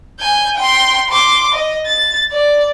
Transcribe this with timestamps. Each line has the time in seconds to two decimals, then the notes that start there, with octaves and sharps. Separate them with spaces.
0.20 G#5 G6
0.56 G5 C6
1.09 C6 D6
1.54 D#5
1.87 A6
2.32 D5